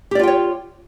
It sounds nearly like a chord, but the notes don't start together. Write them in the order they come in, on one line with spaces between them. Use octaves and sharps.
G4 D5 F4 G5 C#5